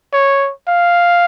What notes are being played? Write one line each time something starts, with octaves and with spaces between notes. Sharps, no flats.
C#5
F5